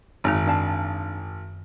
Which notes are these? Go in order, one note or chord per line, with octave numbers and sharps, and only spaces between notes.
G#1 F#2 D#3
D4 F5 A5